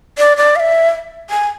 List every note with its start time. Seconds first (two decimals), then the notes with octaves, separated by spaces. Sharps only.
0.18 D5
0.37 D5
0.56 F5
0.60 E5
1.30 G#5